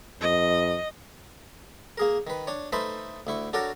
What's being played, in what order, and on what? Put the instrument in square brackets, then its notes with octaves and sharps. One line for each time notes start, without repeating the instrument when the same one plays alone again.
[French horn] F2 [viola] D#5
[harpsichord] A#3 G#4 A#4
D#3 B4
D4 C#5
A3 D#4 A4 B4 C5 B5
D2 E4 C#6
D4 F#4 A4 A#4 C#5 D5